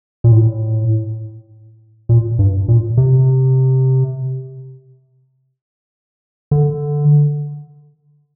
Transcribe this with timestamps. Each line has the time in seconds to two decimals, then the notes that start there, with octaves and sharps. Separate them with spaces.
0.24 A#2
0.32 A2
2.09 A#2
2.39 G2
2.68 A#2
2.97 C3
6.51 D3